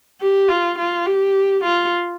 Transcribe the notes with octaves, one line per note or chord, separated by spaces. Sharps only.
G4
F4
F4
G4
F4